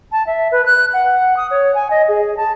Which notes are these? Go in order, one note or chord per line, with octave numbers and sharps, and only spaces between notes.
A5
E5
B4
F#6
F#5
D#6
C#5
G#5
D#5
G#4
A5